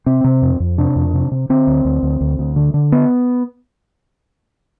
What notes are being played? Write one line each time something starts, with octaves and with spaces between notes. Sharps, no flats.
C3 C4
C3
F2
F2
C3 D4
F2
C3
C3
D3 C4
D2
D2
D2
D2
D2
D3
D3
B3